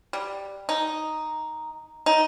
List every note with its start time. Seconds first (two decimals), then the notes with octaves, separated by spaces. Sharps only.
0.13 G3
0.69 D#4
2.06 D#4